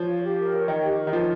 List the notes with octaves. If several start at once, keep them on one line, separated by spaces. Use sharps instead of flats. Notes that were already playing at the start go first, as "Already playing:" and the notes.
Already playing: F3 C#5
F5
G4
A#4
C#5
D#3 G5
G4
A#4
D#3
F3 C#5